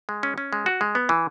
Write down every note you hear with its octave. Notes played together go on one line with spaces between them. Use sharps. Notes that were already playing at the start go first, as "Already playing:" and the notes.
G#3
C#4
C#4
G#3
F#4
G#3
B3
E3